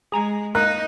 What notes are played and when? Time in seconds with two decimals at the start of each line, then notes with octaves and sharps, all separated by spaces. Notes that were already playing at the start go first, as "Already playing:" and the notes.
0.12 G#3 G#4 A#5 G#6
0.55 A#3 D#4 F#6